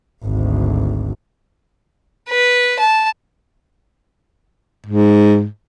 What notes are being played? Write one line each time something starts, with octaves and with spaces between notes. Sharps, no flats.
G#1 D2
B4
A5
G#2